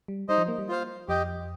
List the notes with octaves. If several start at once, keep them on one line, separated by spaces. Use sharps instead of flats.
G3
G3 D#4 C5 D#5
F3
A#3
G3
F4 C5 F5
F2 G4 D#5 G5